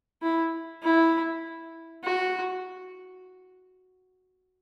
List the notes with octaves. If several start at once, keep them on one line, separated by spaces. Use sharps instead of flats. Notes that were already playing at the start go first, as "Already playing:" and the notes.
E4
E4
F#4